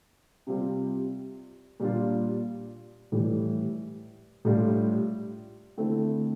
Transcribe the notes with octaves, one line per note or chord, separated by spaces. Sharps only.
C3 G3 C4 F4
A#2 G3 D4 F4
A2 E3 G3
A2 G3 D4 F4
D3 A3 C4 E4